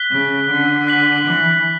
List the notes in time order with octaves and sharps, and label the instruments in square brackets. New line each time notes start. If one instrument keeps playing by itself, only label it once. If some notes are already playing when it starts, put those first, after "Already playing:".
Already playing: [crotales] F#6 B6 G7
[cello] C#3
D3
[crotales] F#6 B6 F#7
[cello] E3